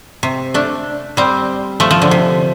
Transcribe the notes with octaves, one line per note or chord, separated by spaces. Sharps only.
C3
A3 D4
G3 C4
F3 A3
F3
D3
C3